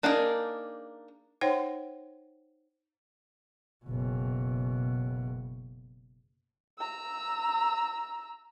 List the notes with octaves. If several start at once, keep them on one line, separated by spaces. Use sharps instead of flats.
A#3 D4 D#4 G#4 A#4
D#4 C5 C#5 F#5 G5 C6
F#1 B2
A#5 E6